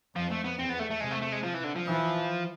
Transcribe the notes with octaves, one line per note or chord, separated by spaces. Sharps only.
F2 F3
A3
B3
E2 C4
B3
A3
A3
C3 G#3
A3
A3
G#3
F3
E3
D3
F3
E3